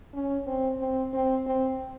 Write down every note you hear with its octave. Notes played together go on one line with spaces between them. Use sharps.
C#4
C4
C4
C4
C4